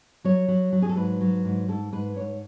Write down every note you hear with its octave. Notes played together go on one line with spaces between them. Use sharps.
F#3 C#5
F#3
F#3
G#4
A4
G#2 B4
F#3
G#2
G#2 A4
G#2 B4
G#2 C#5